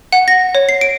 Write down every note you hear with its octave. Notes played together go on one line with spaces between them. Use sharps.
F#5
A#6
C#5
C7
D7